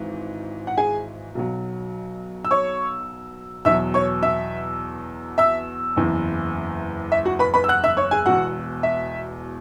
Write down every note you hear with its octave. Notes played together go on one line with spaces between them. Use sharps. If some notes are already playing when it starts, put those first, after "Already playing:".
Already playing: G#1 G#2 E3
F#5
G#4 G#5
B1 B2 F#3
E6
C#5 C#6
E2 B2 F#3 E5 E6
C#5 C#6
E5 E6
E5 E6
F#1 E2 E3
E5
F#4 F#5
B4 B5
B4 B5
E6
F#5 F#6
E5 E6
C#5 C#6
G#4 G#5
E1 E2 B2 F#4 F#5
E5